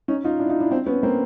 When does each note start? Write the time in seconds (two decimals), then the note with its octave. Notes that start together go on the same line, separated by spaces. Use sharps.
0.08 C#4 D#4
0.24 D#4 F4
0.39 D4 E4
0.50 D#4 F4
0.60 D4 E4
0.71 C4 D4
0.86 B3 C#4
1.03 A#3 C4